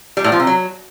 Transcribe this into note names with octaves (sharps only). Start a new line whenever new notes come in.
G3
A2
F3
C3
F#3